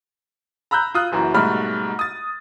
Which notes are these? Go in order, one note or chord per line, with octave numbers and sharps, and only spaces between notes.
A#5 B5 E6 F#6 G6
F4 D#6 F#6
F#1 F#2 E3 F#4
G#2 B2 G3 A3 B5 F6
D#6 A6